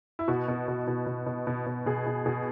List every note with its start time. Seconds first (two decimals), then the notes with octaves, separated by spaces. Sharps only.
0.19 E4
0.28 B2 F#4
0.48 B2
0.68 B2
0.87 B2
1.06 B2
1.26 B2
1.47 B2
1.66 B2
1.86 B2 G#4
2.06 B2
2.26 B2 G#4